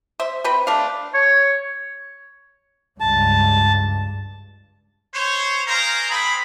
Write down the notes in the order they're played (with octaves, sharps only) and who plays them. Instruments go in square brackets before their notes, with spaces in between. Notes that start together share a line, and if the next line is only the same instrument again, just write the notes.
[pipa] C5 E5
C4 B4 G5
A3 D4 F5
[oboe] C#5
[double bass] C#2 G2 [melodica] A5
[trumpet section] C5 C#5
G#4 A#4 C5 F5 A#5
G#3 C4 G#4 B5